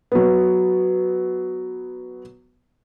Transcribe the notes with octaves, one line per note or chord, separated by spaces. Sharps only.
F#3 B3